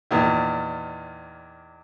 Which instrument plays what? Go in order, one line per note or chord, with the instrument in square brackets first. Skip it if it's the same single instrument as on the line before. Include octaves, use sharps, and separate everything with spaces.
[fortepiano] E2 A#2 D#3